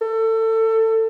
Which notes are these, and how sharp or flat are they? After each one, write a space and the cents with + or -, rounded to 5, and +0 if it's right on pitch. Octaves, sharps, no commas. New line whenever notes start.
A4 +25